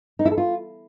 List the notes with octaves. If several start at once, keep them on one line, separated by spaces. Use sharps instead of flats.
D#4
E4
A4
F4